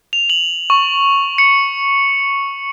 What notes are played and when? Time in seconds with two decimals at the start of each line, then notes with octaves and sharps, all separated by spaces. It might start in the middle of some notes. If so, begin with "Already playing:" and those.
0.13 F7
0.30 F#7
0.70 C#6
1.38 C#7